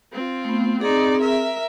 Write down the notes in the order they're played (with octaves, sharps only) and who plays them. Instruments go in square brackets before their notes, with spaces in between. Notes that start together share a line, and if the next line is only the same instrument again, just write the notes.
[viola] C4 F4
[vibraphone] A3 B3
[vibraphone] C4 G#4 [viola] D#4 D5
[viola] A#4 E5